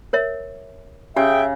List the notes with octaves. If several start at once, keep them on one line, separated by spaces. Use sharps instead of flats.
A#4 C#5 E5
C#3 G4 G#4 E5 G5